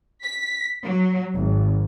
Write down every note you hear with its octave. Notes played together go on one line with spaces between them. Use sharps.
B6
F#3
G#1